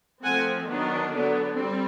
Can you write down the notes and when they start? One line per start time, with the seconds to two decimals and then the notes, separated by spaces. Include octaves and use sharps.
0.24 F3 A3 C4 F#5 G#5
0.68 D#3 F#3 B3 D4
1.12 D3 F#3 B3 D4
1.56 G3 C4